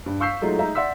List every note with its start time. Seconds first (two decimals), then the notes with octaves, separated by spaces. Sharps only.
0.06 G2
0.20 F5 C#6 E6 G6 B6 C7
0.42 F#3 G#3 A3 D#4 F4
0.58 G#3 D#4 E5 A#5
0.75 D5 E5 F#5 C6 E6 B6